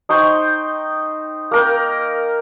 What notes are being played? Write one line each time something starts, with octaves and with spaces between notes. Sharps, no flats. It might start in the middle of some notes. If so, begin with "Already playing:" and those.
D#4 C5 G5 C#6
A#3 A#4 G5